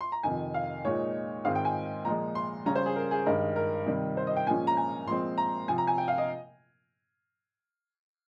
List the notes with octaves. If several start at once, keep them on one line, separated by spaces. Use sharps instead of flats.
C6
A#5
F2 C3 D#3 G#5
F5
A#2 G#3 D#4 C#5
G#2 D#3 G#3 C4 F5
G5
G#5
A#2 F3 G#3 A#5
C6
C#3 G3 C#4 A#5
C5
G#4
A#4
G#4
G2 D#3 G#3 A#4
A#4
C3 D#3 G3
C5
D#5
G5
A#2 F3 G#3 C#4 G#5
A#5
G#5
A#2 F3 G#3 C4 C6
A#5
C3 F3 C4 G#5
A#5
G#5
G5
F5
D#5